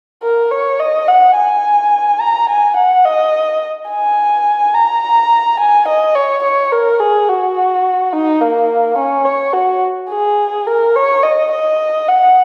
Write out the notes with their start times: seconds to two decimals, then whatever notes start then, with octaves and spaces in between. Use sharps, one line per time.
0.23 A#4
0.51 C#5
0.79 D#5
1.08 F#5
1.37 G#5
2.21 A#5
2.49 G#5
2.77 F#5
3.05 D#5
3.91 G#5
4.75 A#5
5.60 G#5
5.88 D#5
6.15 C#5
6.44 C#5
6.72 A#4
7.00 G#4
7.29 F#4
8.13 D#4
8.41 A#3
8.98 C#4
9.25 C#5
9.53 F#4
10.10 G#4
10.67 A#4
10.95 C#5
11.23 D#5
11.52 D#5
12.08 F#5